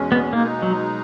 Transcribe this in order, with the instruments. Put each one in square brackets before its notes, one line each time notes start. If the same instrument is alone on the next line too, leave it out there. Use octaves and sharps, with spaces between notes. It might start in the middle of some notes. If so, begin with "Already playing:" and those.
Already playing: [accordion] E2 B2 G#3 C#4
[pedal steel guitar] B3
[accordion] B2 G#3 D#4 [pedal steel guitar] A#3
[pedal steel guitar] F#3